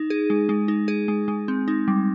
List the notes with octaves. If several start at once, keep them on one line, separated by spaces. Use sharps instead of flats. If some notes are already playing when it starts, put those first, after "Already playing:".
Already playing: D#4
G#4
G#3
G#3
D#4
G#4
G#3
G#3
C4
D#4
G3